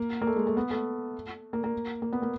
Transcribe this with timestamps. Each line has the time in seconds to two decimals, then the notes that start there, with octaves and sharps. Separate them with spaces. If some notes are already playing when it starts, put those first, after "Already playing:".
Already playing: A#3
0.22 A#3
0.27 A3
0.36 G#3
0.47 A3
0.57 B3
0.71 A3
1.53 A#3
1.64 A#3
2.02 A#3
2.13 B3
2.22 A#3